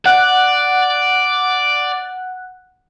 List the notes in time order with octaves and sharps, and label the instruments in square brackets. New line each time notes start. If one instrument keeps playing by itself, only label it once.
[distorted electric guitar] D5 [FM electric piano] F#5 F#6